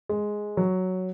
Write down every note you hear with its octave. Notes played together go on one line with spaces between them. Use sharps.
G#3
F#3